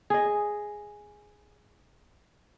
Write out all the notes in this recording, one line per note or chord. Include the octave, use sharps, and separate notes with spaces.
G#4 D#5